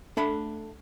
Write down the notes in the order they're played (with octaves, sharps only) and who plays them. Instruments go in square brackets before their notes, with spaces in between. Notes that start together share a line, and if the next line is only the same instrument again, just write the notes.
[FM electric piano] A3 [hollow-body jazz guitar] D4 F#5 B5